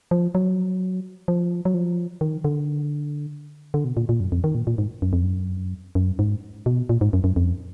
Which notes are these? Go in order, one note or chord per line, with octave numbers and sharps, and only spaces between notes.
F3
F#3
F3
F#3
F3
D#3
D3
D3
B2
A#2
A#2
F#2
F2
D#3
A#2
A#2
G#2
F#2
F2
F#2
F#2
G#2
B2
A#2
G#2
F#2
F#2
F2